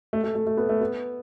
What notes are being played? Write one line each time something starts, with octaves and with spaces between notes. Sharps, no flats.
A3
A3
A3
A3
B3
A3
B3